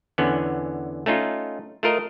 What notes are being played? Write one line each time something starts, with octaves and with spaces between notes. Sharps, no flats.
E2 D3 B3 C#4
A3 C#4 D#4 F4
A3 F4 A#4 D#5